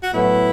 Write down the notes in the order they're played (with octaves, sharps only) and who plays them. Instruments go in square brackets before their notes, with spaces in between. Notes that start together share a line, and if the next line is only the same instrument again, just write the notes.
[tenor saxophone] F#4
[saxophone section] A2 F#3 B3 [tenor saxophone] E4